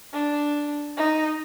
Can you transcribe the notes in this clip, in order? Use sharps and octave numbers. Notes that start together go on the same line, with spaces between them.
D4
D#4